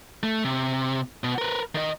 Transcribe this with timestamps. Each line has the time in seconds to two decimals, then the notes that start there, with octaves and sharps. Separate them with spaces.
0.23 A3
0.44 C3
1.24 B2
1.38 A#4 B4
1.75 D#3 D#5